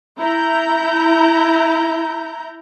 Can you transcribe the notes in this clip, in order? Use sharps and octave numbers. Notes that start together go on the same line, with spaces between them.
E4 A#5 G6